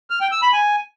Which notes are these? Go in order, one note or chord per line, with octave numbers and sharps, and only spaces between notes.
F6
G5
E6
B5
G#5